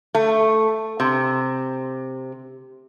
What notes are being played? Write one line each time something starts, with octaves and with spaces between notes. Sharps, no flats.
A3
C3